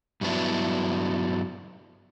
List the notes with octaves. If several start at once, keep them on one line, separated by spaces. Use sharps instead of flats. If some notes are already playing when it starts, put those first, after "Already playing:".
G2 F#3 B3 D4 E4